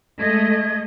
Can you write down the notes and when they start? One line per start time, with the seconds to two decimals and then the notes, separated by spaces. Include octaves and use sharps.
0.20 G#3 A3 D#5 G#6